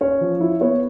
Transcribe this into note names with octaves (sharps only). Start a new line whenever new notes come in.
C#4 C#5
F3
E4
B3 C#5